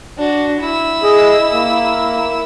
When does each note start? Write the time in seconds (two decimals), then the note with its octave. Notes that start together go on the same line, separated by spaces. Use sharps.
0.17 D4 F#4
0.60 E4 E6
1.03 G#4 D#5
1.52 A#3